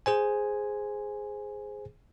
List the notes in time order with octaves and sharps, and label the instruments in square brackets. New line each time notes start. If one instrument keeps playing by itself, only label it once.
[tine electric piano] G#4 C5 G#5